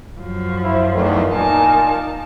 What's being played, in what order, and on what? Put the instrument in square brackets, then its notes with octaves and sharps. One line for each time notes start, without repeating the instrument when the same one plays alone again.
[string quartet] F#2 F3
[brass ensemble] E4 C5
E2 D#3 A3
[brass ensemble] A#2 G#5 [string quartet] D#4 A#4 A5